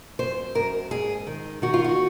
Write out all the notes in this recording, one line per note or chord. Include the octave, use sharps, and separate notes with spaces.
F#2 C5
F#2 A#4
G#2 G#4
D#3
D#3 F#4
F4
F#4